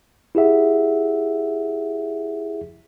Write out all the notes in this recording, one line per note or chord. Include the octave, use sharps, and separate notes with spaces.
E4 G4 G#4 E5 F#5